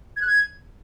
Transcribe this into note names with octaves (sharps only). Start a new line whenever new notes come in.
G#6
F#6
G#6